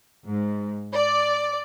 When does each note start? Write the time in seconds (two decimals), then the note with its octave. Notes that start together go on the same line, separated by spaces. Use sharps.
0.24 G#2
0.93 D5